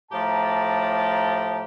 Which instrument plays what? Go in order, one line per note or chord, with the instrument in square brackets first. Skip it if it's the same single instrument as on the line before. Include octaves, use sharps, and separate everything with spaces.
[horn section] A2 F3 G4 A5 A#5